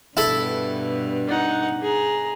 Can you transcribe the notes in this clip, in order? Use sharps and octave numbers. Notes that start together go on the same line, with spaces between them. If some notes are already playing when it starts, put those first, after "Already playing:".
G2 B2 E4 A4 B5
D#4 F#5
G#4 A#5